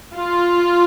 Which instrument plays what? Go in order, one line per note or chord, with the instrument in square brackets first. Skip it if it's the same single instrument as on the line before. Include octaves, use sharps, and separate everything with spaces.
[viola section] F4